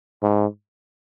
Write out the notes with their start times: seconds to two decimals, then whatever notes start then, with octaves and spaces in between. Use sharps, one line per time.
0.23 G#2